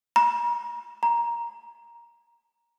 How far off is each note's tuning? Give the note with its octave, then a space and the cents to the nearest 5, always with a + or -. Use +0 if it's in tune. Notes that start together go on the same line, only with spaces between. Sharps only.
A#5 +45
A#5 +10